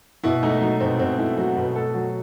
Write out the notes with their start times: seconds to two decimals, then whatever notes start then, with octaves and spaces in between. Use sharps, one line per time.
0.24 B2 E4
0.43 A3 D#4
0.62 F#3 D#4
0.80 B2 C4
0.99 B2 C4
1.19 A3 E4
1.38 F#3 F#4
1.56 B2 B4
1.75 A3 A4
1.94 F#3